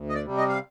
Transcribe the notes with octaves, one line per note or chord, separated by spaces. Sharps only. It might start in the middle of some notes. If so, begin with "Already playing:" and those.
Already playing: D2
D#5
D5
C3 G3
D#5
F5